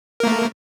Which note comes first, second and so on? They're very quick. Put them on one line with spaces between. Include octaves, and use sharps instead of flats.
A#4 A#3 A3